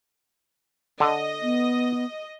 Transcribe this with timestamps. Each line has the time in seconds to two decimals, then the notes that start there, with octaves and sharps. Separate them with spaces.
1.00 D3 D#5
1.43 B3